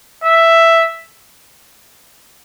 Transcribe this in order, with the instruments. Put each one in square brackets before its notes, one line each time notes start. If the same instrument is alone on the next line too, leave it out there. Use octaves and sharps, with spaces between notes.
[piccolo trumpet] E5